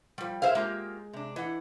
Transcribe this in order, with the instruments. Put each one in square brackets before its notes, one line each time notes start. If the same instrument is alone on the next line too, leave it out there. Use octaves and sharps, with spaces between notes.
[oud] F3 G3
[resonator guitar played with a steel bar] G#4 A#4 E5 [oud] C5 F5
[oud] G#3 [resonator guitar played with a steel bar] A#3 F4 G4
[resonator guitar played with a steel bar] C3 D4
[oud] E3 [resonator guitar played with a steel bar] D#5 F#5